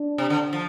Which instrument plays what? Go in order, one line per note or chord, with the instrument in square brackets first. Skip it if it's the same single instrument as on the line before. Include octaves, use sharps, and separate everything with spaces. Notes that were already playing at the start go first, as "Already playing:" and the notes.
Already playing: [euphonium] D4
[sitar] C3
D3
F3